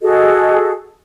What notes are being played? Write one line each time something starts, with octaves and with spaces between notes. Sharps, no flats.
F#4 G#4 A4 D#5